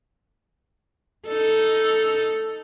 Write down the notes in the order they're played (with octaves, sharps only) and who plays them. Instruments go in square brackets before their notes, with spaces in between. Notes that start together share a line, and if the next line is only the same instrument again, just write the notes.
[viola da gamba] D#4 A4